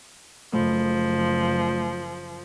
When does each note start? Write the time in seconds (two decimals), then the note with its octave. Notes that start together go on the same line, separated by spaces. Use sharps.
0.53 F#1 F3 A3